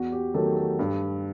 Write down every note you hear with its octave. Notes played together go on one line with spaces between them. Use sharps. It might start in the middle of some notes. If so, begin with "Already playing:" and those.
Already playing: E2 F#4
G4
D#3 F#3 A3 A4
A4
G2